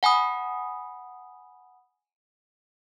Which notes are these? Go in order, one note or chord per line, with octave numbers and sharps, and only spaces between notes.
F#5 G#5 B5 D#6